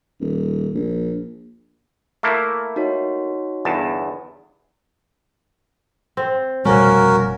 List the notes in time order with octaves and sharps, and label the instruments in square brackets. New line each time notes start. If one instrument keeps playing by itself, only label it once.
[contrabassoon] D#1
A#1
[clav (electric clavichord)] A3 A#3 E4
[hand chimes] D#4 F#4 C#5
[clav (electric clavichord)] G1 E2 A5
[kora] C4
[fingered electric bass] F1 B2 G3 [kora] A#3 C#4 [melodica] F#4 A#4